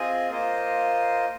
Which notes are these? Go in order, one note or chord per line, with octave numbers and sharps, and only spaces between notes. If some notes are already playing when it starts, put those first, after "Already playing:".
Already playing: C4 F4 G#4 D#5 G#5
A#3 F4 C5 D#5